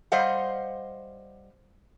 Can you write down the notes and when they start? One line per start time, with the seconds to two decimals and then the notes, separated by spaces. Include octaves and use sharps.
0.12 G3 C5 D#5 F5 F#5